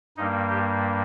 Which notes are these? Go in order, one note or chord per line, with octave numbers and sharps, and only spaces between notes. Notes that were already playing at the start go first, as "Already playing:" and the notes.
G2 G3 A#3 D#4
G4